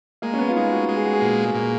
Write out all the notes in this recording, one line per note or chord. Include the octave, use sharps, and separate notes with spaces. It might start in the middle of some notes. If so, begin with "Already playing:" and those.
G#3 A#3
C#4
B3
F4
G#3 D#4
F#4
G#3
G#4
F#4
G#4
A#2
A#2